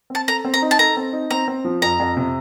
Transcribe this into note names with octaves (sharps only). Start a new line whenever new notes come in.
C4 A5
A4 A#5
C4
A#5
D#4
A5
A4 A#5
C4
D#4
C4 A#5
C4
F3
F2 A#5
F2
C3